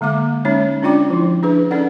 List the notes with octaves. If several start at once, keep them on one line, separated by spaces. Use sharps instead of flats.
D3 G#3 A#3 D6
G#3 C#4 D#4 C#5
C#4 D4 F4 D5 G5 D6
F3 E4
D4 G#4 B4
C#4 D#4 A4 D5 F#5